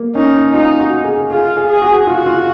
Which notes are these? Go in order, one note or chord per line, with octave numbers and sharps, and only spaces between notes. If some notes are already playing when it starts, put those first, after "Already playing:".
Already playing: A#3
C#4 D#4
D#4 F4
F#4
G#4
F4 G#4
G#4
G#4
F#4
F4 F#4
F4